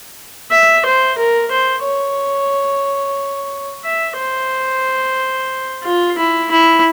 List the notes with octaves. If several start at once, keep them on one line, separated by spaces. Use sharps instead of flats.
E5
C5
A#4
C5
C#5
E5
C5
F4
E4
E4